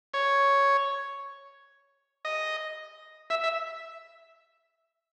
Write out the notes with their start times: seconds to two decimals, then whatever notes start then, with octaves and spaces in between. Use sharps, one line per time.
0.14 C#5
2.25 D#5
3.30 E5
3.44 E5